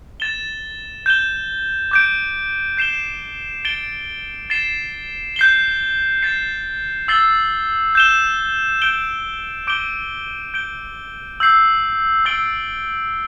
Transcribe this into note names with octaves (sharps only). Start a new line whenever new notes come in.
A6 E7 G7
G6 E7 G7
D6 G6 D7
G6 C7 E7 G7
A6 D7 G7
A6 C7 E7 G7
G6 C7 G7
A6 C7 E7
E6 A6 C7 G7
G6 E7 G7
G6 D7 G7
D6 G6 D7 G7
G6 D7 G7
E6 G6 C7
E6 A6 D7 G7